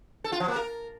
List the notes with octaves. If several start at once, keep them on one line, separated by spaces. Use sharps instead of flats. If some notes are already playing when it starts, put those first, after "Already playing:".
A4
F4
F3
A#3
A#4